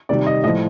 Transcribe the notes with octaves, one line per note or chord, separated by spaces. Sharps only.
C3 D#3 G3 D5
D#5
A2 F3 D#5